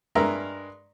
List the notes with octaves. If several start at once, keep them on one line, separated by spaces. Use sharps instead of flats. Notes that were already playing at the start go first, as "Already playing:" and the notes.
G2 G#3 A#4 E5 A#5